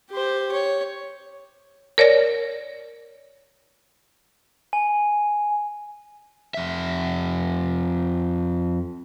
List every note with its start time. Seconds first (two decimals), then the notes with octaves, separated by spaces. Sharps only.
0.11 G4 C5
0.52 C#5
1.98 A#4 C#5 D5 A#6
4.73 G#5
6.54 F2 E5